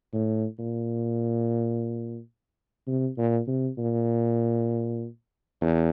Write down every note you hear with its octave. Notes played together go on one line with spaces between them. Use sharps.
A2
A#2
C3
A#2
C3
A#2
E2